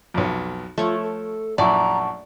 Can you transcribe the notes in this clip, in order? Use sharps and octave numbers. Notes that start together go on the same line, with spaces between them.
B1 F2
F3 A3 F4 C#5
A4
A#1 F#2 E4 D5 F#5 A5 A#5 C#6